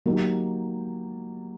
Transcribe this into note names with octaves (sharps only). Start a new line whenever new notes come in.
F#3 A#3 D#4 G4